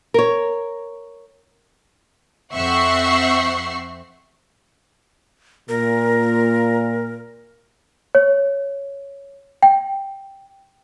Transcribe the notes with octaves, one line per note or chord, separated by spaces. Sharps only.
A#4 C#5
F2 C4 E5 F#5 C#6 C7
A#2 A#4
C#5
G5